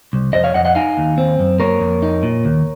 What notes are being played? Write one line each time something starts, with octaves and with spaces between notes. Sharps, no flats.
C2
F2 C5 D#5
C#5 F5
F2 D#5 F#5
D#5 F#5
D#4 F5 G#5
D#2
C4
F#2
A#3 A#4 C#5
F2
D#4
A#2
D#2